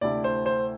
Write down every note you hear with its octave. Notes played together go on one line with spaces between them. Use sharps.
D2 C3 A3 E4 D5
C5
C5